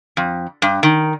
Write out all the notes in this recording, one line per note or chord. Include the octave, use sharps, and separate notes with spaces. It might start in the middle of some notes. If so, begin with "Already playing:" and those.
F2
G2
D#3